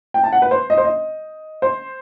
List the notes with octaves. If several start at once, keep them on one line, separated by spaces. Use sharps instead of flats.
G5
A5
F#5
B4
C5
D#5
C5
D#5
C5